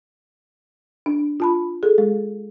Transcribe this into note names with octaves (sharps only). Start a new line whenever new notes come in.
D4
F4 A5 B5
G#4 A4
G#3